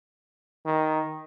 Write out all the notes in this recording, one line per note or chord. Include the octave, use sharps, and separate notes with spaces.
D#3